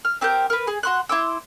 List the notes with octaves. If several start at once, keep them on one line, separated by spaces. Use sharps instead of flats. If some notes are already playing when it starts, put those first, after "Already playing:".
F6
C4 G4 A#4 G6
A#4 B4
G#4
F#4 C6 F#6
E4 C6 D6 E6